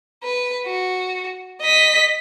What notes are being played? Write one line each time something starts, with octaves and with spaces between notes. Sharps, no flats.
B4
F#4
D#5 B6